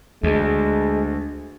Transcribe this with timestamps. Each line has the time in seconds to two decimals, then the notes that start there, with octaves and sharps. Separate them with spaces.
0.23 D2 G#3